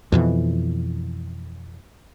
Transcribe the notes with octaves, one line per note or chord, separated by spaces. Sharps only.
F2 B2 E3